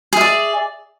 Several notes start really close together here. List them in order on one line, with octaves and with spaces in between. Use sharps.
G#4 E5 D5